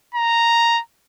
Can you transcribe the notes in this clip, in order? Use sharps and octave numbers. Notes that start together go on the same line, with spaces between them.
A#5